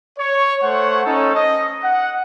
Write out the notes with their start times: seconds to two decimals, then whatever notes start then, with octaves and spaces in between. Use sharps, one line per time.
0.18 C#5
0.62 A3 C5 C#5 F#5
1.05 C#4 D#4 A4
1.35 D#5
1.83 F#5